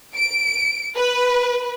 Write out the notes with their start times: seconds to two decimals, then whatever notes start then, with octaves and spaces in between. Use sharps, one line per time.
0.16 D7
0.97 B4